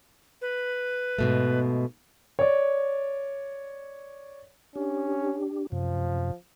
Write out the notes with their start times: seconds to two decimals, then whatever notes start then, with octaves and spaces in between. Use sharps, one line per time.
0.41 B4
1.19 G#2 B2 A3
2.39 C#5 D5
4.76 C#4 D4 G4
5.72 F#2 C3 F3